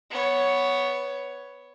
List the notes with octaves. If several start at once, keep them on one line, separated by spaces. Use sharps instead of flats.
B3 C#5